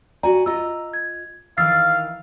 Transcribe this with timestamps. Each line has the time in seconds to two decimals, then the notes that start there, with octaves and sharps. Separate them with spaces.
0.23 F#4 D5 G#5 A#5
0.46 F4 D#5 A#5 E6
0.93 G#6
1.58 D#3 E3 F5 E6 A6 C7